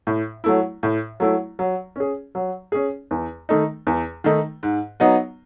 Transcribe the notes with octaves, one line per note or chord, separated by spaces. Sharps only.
A2
F#3 A3 E4
A2
F#3 A3 E4
F#3
C#4 G#4
F#3
C#4 G#4
E2
D#3 A3 D#4
E2
D#3 A3 D#4
G#2
F#3 B3 D#4